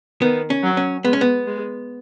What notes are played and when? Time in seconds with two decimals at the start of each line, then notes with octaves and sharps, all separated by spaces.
0.22 D#3 B3
0.50 C#4
0.63 F#3
0.77 C#4
1.05 G#3 B3
1.13 C#4
1.21 B3
1.47 G#3